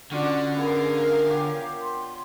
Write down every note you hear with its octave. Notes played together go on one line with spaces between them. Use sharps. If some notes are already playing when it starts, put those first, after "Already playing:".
D3 C#4 D4 F4 F#4
B3 G#4 A#4 F5
G4 C#5 G5
C6